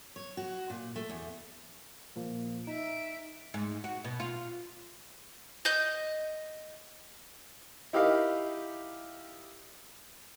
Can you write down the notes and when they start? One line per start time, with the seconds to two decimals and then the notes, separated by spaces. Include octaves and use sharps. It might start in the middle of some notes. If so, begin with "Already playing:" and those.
0.16 C#5
0.37 F#4
0.70 A#2
0.96 A3
1.10 E2
2.16 A#2 F3 A#3
2.67 D#4 E5 D7
3.54 G#2
3.84 F#4
4.05 B2
4.20 F4
5.65 D#5 G6
7.93 D#4 E4 G4 A#4 D#5 F5